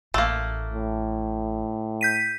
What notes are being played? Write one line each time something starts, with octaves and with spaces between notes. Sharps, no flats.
A1 A3 A#3
A2
G6 B6 D#7